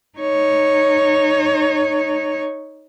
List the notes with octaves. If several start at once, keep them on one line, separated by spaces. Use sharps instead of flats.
D#4 C#5